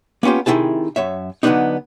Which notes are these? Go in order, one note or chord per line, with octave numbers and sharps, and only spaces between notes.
A#3 B3 C#4 F4 G4
C3 D#3 A3 E4 G#4 A5
F#2 C#5 E5
D3 F#3 G#3 B3 D4 D#4